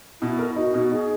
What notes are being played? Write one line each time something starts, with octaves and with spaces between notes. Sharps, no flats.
B2 E4
A#4
D#4 F#4
B2
D#4 G#4